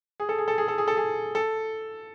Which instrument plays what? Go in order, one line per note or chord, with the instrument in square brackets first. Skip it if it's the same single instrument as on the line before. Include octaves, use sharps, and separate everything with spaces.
[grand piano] G#4
A4
G#4
A4
G#4
A4
G#4
A4
G#4
A4